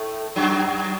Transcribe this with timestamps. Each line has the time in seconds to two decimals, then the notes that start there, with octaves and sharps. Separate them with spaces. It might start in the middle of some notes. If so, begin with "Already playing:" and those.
Already playing: A2 A3
0.36 F#2 F#3